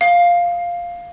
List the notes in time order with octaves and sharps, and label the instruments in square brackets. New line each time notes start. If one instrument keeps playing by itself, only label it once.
[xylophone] F5